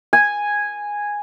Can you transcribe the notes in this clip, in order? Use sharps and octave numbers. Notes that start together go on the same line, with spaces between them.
G#5